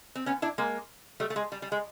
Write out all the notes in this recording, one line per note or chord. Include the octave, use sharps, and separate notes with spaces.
C4
B3 C#4
D4 E4
G#3 A#3
G3 A3
A3
G#3
G3
G3
G#3